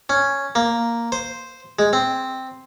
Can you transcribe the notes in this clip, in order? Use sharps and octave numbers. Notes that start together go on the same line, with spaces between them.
C#4
A#3
C5
G#3
C4